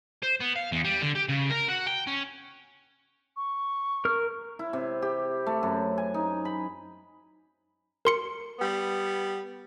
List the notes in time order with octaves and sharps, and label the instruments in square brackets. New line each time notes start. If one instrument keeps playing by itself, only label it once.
[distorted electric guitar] C5
B3
F5
E2
G3
D3
G4
C#3
A#4
F#4
G5
C#4
[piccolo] C#6
[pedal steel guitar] A#4 F6
[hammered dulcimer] E4
C3
G4
A3
F#2
G#5
D#4
B5
[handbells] A#4 C6 C#7
[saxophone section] G3 B3